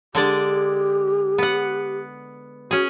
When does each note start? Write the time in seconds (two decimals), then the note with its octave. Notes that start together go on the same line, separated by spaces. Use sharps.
0.15 D3 G#3 G4 D5
1.38 B3 F#5
2.71 C#4 F#4 G#4